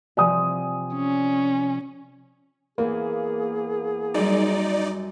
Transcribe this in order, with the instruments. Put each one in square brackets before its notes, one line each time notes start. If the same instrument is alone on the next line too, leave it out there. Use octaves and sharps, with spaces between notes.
[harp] C3 F3 [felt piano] D5 G#5 D#6
[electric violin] C#4
[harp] E2 [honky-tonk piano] A#3 [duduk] G#4
[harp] F#2 G3 [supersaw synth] D#4 D5